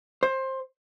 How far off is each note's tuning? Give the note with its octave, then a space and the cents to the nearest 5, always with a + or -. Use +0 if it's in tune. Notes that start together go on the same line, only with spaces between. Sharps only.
C5 +20